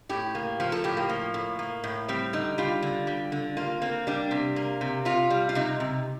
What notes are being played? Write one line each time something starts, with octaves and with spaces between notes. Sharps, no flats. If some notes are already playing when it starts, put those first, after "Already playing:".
A2 G4
A#3
F3 F4
A4
A2 G4
A#3
F3
A2
A#3
A2
G3 C4
D3 D#4
G3 F4
D3
G3
D3
A#3 F4
A#3 C4
G3 D4
C3
A#3
C3
C3 F4
G3
F4
C3 D#4
C3